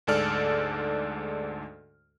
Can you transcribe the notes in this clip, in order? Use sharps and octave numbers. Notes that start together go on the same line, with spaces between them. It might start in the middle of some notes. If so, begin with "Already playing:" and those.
D2 G#2 G#3 A4 D5 F6